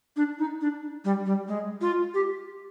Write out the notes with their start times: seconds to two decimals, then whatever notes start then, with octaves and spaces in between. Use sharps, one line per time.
0.17 D4
0.39 D#4
0.61 D4
1.05 G3
1.26 G3
1.48 G#3
1.81 F4
2.14 G4